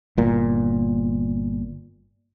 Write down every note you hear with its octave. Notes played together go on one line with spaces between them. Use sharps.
G1 A#2